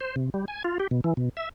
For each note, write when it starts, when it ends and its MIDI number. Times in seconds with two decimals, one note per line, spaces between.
0.01 0.16 72
0.16 0.30 48
0.34 0.45 55
0.48 0.63 80
0.64 0.78 65
0.80 0.87 67
0.91 1.01 47
1.04 1.14 52
1.17 1.29 47
1.37 1.49 76